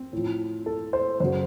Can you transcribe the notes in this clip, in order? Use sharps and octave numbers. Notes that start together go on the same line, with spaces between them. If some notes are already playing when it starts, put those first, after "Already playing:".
Already playing: C4
A2 F3
A4
C5
F#2 C#3 F#3 C5